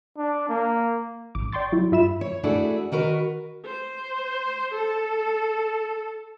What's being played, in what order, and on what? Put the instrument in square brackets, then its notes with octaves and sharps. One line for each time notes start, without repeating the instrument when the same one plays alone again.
[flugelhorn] D4
A#3
[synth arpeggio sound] A1 D6
D5 G5 C6 C#6 A6
F#3 E4
G2 F4 E5 B5 E7
[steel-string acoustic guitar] C#5
A3 D4 E4 F#4 G#4 A4
D#3 F#4 A#4 B4
[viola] C5
A4